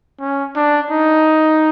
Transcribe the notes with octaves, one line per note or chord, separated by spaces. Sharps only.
C#4
D4
D#4